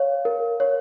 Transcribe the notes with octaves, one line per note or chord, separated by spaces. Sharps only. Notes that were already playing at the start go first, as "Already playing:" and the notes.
Already playing: C#5 F5
A#4
C#5